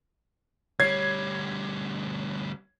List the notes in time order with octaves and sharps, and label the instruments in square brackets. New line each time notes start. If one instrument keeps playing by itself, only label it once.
[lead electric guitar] D2 G3 [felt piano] C#5 [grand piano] G#6 C7